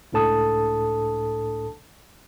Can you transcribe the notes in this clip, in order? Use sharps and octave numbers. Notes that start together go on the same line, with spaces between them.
C#2 A2 D4 A4 A5 D#6